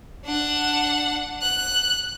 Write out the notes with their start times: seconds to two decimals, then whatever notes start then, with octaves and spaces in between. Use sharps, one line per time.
0.25 D4 F#5
1.41 F#6